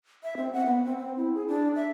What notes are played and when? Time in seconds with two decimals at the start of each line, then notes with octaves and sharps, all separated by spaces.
0.23 E5
0.37 C4
0.53 F#5
0.66 B3
0.85 C4
0.98 C4
1.17 E4
1.35 G#4
1.48 D4
1.76 E5